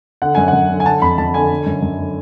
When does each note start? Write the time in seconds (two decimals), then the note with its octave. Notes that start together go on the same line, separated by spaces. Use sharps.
0.22 D3 F#5
0.35 F#2 G#5
0.48 F#5
0.53 F#2
0.70 D3
0.80 G#5
0.86 D3 A5
1.02 F2 B5
1.18 F2 A5
1.34 D3 G#5
1.50 D3
1.67 F#2
1.82 F#2
1.99 D3